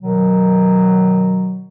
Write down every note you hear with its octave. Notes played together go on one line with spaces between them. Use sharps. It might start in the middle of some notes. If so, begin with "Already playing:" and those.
B2 D#3 F#3